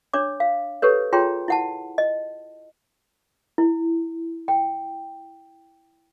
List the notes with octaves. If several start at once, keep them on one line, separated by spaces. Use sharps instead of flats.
D4 C#5 D6
F5
G4 A4 B4 C#5
F4 G#4 C#5 G5 A#5 C6
E4 F#5 A5
D#5
E4
G5